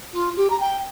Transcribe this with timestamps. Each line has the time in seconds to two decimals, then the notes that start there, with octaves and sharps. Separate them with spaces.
0.13 F4
0.37 G4
0.50 A#5
0.60 G5